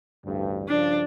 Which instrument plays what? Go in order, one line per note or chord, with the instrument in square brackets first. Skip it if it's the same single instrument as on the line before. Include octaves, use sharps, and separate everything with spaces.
[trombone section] A1 D2 G2
[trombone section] G2 C#3 F3 [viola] D4